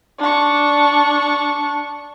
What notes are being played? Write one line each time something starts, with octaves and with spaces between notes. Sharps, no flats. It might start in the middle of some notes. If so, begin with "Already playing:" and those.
D4 C#6